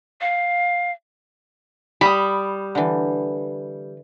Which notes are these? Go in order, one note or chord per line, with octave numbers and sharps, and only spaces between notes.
F5
G3 B5 D#6
D3 E3